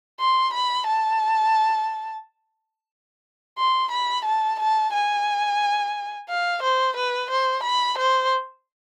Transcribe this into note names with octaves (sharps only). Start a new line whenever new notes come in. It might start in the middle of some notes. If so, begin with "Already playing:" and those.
C6
B5
A5
C6
B5
A5
A5
G#5
F5
C5
B4
C5
B5
C5